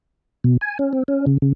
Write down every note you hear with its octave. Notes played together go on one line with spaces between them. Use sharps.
B2
G#5
C#4
C4
C#4
C#3
C#3